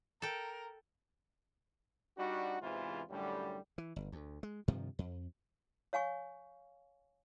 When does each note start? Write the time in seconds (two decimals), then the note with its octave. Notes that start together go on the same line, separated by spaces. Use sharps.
0.22 A4 A#4 G5
2.18 G3 D4 D#4 F#4
2.61 E2 G#2 C3 E3 E4 F4
3.09 F#2 A2 D3 G3
3.78 E3
3.96 G1
4.12 D2
4.43 G#3
4.68 G2 C3 D#3 F3
4.99 F2
5.93 C#5 F5 G#5 C#6